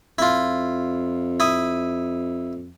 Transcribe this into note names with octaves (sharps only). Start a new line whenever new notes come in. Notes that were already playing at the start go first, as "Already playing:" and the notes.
F2 E4 F4
E4 D#6